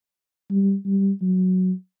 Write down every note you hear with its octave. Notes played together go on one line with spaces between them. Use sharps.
G3
G3
F#3